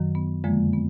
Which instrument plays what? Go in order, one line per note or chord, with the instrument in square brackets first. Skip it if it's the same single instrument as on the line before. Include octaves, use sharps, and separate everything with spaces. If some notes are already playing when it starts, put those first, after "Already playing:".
Already playing: [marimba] F#2 D#3 F#3
B3
F2 D3 F3 G#3 A#3
B3